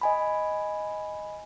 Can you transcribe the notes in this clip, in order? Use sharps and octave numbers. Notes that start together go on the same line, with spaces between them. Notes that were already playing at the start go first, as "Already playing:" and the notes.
D#5 G#5 B5